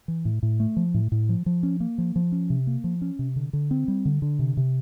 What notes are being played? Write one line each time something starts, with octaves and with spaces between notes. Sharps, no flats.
E3
A2
A2
A3
F3
A2
A2
F3
F3
C#4
A#3
F3
F3
C#4
C3
A#3
F3
C#4
C3
D3
D3
C4
G3
D3
D3
C3
C3